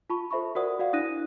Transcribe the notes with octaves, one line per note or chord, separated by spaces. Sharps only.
F4 A5 B5 C#6
A4 C5 E5 B5 C#6
F#4 A#4 C5 D5 F#5 D#6
F#4 D5 F5 F#5
D4 E4 D#6 F#6 A#6 D#7